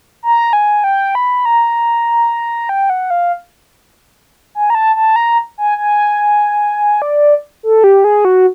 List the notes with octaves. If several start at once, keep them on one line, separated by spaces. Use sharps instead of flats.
A#5
G#5
G5
B5
A#5
G5
F#5
F5
G#5
A#5
A5
A5
A#5
G#5
G#5
D5
A4
G4
G#4
F#4